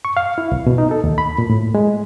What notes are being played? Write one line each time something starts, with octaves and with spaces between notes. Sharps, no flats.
C#6
F5
E4
C2
B2
D#4
A4
D#2
B5
A#2
A2
G#3